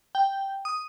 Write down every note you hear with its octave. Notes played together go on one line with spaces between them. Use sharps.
G5
D#6